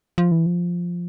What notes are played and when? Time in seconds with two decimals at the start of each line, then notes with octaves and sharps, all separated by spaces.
0.18 F3
0.32 E3
0.46 F3